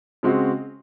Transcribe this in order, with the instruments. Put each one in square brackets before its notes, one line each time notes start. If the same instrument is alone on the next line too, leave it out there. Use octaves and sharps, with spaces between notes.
[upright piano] C#3 G#3 C4 F#4